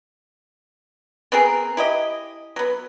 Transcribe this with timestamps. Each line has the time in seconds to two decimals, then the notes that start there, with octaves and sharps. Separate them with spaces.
1.32 B3 C4 G#4 A#4
1.77 E4 G4 D#5
2.56 F#3 B3